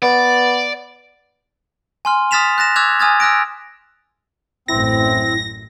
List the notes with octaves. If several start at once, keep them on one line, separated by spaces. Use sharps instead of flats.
B3 D5
G#5 C6 F6
D#6 F6 A6 B6 E7 F7
F#6 A6 A#6 E7
D6 E6 F#6 G#6 F7
G#5 D#6 F6 G#6 A6
E6 F#6 A#6 D7
A1 F#2 C4 E4 A#6